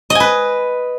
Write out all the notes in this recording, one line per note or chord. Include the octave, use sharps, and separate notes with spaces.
D#5
G#5
B4